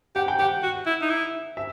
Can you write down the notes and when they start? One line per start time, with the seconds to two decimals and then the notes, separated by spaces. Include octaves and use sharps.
0.16 G4 F#5
0.28 G5
0.39 G4 F#5
0.63 F#4
0.86 E4
1.02 D#4
1.10 E4
1.57 E5